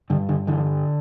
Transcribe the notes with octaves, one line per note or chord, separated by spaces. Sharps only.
G2 D3
D3
D3 E3